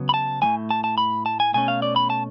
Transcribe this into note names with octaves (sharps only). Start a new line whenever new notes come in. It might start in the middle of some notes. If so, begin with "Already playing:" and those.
Already playing: C#3 F#3 B3
B5
A5
A2 F3 A3 G#5
A5
A5
B5
A5
G#5
B2 A3 C#4 G#5
F5
D5
B5
A5